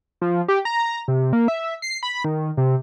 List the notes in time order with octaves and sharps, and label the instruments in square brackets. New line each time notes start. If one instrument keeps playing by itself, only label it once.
[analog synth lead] F3
G4
A#5
C3
A#3
E5
C7
B5
D#3
C3